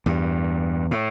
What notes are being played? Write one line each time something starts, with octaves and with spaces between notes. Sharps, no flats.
E2 G2
A2